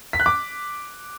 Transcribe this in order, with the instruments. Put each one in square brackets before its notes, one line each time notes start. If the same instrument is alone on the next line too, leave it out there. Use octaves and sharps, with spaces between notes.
[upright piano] B6
F#6
D6